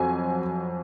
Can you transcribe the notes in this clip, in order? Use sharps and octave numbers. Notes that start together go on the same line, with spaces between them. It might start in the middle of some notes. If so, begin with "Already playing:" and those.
Already playing: F2 F#3 G#5